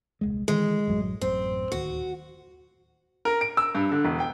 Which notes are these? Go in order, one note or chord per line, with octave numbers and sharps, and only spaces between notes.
D#1 C2 G#3
D#3 E3 G#3
A1 F#2 F#3
A1 F#2 C4
D1 D#2 F#4
A#4
D7
E6
G2
D3
E1
G5